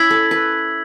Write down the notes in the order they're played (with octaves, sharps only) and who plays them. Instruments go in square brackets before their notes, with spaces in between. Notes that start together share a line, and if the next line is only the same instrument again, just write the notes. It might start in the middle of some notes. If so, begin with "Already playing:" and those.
Already playing: [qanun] C#4 E4 [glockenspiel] E6 G#6 B6 F#7
[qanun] A4
B4